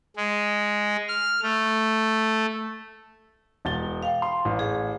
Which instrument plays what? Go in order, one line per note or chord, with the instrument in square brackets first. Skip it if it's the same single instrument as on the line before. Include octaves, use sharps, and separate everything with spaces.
[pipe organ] G#3
F6
A3
[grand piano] E1 A6 G7
[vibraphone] F5 G5
[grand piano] C6
A1
[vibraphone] G#4